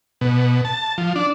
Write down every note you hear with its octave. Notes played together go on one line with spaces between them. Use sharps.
B2
A5
F3
D4